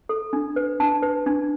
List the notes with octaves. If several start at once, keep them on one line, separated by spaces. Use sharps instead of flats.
A4
D4
B4
D4 A5
B4
D4